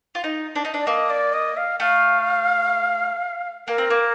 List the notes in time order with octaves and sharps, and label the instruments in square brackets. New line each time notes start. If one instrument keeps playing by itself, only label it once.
[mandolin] F4
D#4
D4
D#4
D4
[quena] D5
[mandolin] A#3 [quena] D#5
[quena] D5
D#5
F5
[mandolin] A3 [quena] F5
[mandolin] A#3 [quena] A#4
[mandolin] C4
A#3